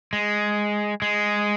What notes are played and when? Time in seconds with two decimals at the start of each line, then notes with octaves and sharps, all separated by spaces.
0.13 G#3
1.02 G#3